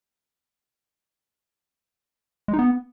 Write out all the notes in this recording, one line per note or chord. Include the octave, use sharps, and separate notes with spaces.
G#3
D#4
B3